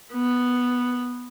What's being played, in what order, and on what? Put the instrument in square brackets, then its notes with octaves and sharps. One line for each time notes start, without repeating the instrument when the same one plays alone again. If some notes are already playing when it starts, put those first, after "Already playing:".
[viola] B3